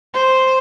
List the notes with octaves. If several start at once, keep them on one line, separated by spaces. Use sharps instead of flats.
C5